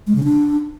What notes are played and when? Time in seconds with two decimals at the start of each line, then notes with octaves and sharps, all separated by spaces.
0.07 G#3
0.15 C#3
0.24 D4